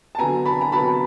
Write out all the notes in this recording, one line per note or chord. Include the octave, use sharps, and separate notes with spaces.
A5
D3 F#3 B3 G#5 A#5
A5 B5
A#5
D3 F#3 B3 A5 B5